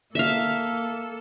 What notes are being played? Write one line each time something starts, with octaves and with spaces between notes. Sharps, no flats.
A#3 A4 E5 F5